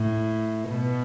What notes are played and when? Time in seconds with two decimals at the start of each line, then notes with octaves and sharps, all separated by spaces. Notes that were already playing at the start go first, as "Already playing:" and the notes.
Already playing: A2
0.70 B2